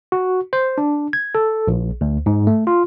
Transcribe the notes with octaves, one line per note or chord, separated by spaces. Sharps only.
F#4
C5
D4
G#6
A4
A#1
D2
G#2
A3
F4